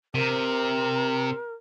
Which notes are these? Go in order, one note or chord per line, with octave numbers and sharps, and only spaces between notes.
C3 A#4